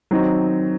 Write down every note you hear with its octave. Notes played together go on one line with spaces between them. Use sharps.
D#3 F#3 C4 D#4